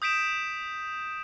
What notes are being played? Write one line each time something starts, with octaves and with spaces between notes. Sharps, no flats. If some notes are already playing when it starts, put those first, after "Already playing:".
D#6 G6 B6 D7 E7